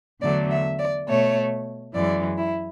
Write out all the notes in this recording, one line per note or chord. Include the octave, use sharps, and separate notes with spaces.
E2 D3 F#3 A3 D5
E5
D5
B2 A3 C#5
F#2 E3 G#3 D5
E4